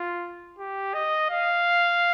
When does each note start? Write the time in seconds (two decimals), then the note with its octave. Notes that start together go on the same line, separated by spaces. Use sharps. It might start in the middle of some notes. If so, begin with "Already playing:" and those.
Already playing: F4
0.59 G4
0.94 D#5
1.30 F5